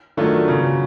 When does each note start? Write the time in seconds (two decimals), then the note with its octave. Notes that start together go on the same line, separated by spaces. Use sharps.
0.17 D#3 F#3 A3 D4 F4
0.48 C#3 F#3 B3